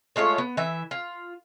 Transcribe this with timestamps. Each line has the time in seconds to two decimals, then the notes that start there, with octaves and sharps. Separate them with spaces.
0.16 G#3 A3 F4 C#5
0.38 B3
0.57 E3 E5
0.91 F4